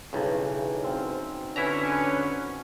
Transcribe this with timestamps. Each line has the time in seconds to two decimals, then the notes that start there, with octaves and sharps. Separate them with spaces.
0.13 B1 G2 C#3 E3 D#4
0.83 F#3 C4 F5
1.56 D3 C#4 E4 B4 E5 A#5